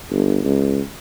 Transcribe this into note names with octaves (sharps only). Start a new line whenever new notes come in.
G1
C#2